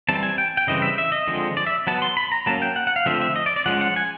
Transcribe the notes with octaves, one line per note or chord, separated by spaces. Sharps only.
E3 G3 C4 A5
G#5
G5
G5
C#3 E3 G3 C4 D#5
E5
E5
D#5
D3 F3 G#3 C4
D5
E5
F#3 B3 A5
C6
B5
A#5
F#3 A#3 C#4 A5
G5
F#5
F#5
F5
D3 F3 A3 C4 E5
E5
D#5
D5
D5
F3 G#3 C#4 F#5
F#5
G#5